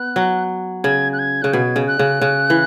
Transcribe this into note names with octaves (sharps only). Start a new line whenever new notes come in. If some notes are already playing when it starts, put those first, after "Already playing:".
Already playing: B3 F#6
F#3
C#3 G#6
F#6
G#6
C#3 F#6
B2 G#6
C#3
F#6
C#3
C#3
E3